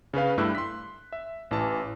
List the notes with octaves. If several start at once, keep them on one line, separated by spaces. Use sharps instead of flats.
C#3 C#4 B4 F5
G2 A3 E4 G4 E6 F#6
C6 B6
E5
A1 E3 A5